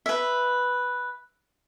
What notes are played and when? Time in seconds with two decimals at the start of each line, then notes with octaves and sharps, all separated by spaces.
0.06 B4 E5